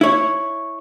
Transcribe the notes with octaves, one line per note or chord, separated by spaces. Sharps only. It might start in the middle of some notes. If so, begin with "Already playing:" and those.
E4 C#5